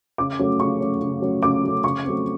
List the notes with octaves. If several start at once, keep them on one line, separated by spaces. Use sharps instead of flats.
C#3 D6
F#3 A3 C#4
C#3 C#6
F#3 A3 C#4
C#3
F#3 A3 C#4
C#3 D6
F#3 A3 C#4
C#3 C#6
F#3 A3 C4